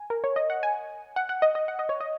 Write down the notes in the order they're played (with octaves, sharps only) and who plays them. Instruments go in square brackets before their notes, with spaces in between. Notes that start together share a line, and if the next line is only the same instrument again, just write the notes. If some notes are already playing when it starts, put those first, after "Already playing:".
Already playing: [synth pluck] G#5
A#4
C#5
D#5
F#5
G#5
F#5
F#5
D#5
D#5
F#5
D#5
C#5
D#5